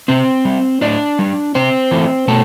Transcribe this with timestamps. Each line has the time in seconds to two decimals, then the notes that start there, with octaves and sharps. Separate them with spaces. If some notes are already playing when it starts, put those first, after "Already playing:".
0.08 C3 C4 C5
0.45 G3
0.81 A2 D4 D5
1.19 G3
1.55 C3 C4 C5
1.91 E3 A3
2.28 B2 A3 A4